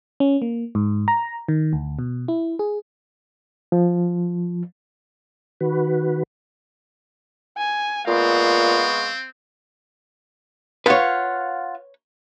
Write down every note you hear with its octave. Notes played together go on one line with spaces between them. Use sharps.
C#4
A#3
G#2
A#5
D#3
D2
B2
E4
G#4
F3
D#3 F#4 B4
G#5
A#2 G#3 B3 C4 F5 C#6
F4 B4 C#5 F5 F#5